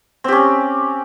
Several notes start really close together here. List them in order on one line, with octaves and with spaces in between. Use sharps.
C4 G4 C#4